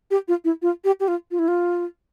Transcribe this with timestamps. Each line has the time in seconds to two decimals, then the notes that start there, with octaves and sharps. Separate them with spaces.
0.11 G4
0.28 F4
0.45 E4
0.62 F4
0.84 G4
1.00 G4
1.08 F4
1.31 F4
1.39 E4
1.48 F4